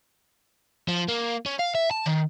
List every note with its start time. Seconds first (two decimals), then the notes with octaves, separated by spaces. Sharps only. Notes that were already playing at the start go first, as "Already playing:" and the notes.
0.88 F3
1.08 A#3
1.46 C#4
1.59 F5
1.75 E5
1.91 A5
2.06 D#3